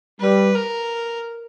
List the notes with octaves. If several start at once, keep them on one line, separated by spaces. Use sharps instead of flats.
G3 B4
A#4